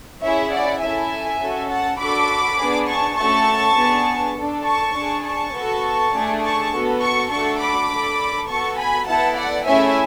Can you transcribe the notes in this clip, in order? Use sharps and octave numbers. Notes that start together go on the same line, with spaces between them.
C#4 E4 G#4 C#5 E5
D5 F#5
C#4 E4 A4 E5 G#5
C#4 F#4 A4
F#5 A5
D4 F#4 A4 B5 D6
B3 D4 G#4
A5 C#6
A3 C#4 F#4 A4 A5 C#6
B3 D4 G#4
D4 A4
A5 C#6
D4 G#4
A5 C#6
B3 F#4 A4
A3 D4 G#4
A5 C#6
B3 F#4 A4
A5 C#6
A3 D4 F#4 A4 A5 C#6
B5 D6
D4 A4
B3 F#4 A4 A5 C#6
G#5 B5
B3 E4 A4 F#5 A5
D5 F#5
A3 C#4 E4 G#4 E5 G#5